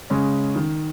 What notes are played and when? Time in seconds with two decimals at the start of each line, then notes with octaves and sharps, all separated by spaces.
0.10 C#3 G#3 C#4
0.56 D#3